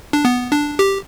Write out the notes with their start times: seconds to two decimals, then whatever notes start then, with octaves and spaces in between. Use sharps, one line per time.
0.13 D4
0.25 B3
0.52 D4
0.79 G4